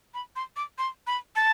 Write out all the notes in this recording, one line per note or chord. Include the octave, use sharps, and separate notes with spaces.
B5
C6
D6
C6
B5
A5